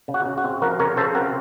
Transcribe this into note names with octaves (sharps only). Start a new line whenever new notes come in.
C#3
F#4
C#3
F#4
C4
F3 F#4 A#4
C#3 A#4 C#5
C#3 A4 C5
C4 F#4 A#4